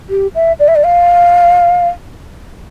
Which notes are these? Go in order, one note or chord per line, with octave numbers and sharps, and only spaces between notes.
G4
E5
D5
E5
D5
F5